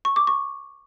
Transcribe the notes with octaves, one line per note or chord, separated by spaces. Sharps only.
C#6
D6
C#6